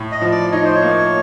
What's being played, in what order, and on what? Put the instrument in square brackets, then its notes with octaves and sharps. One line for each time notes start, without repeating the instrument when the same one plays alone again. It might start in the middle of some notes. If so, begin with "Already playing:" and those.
Already playing: [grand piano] A2
[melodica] D#5
[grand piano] F3
[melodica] D5
[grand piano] D#4 [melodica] C#5
[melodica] C5
C#5
[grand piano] A#3